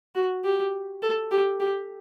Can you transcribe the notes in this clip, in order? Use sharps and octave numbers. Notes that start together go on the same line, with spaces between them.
F#4
G4
A4
G4
G4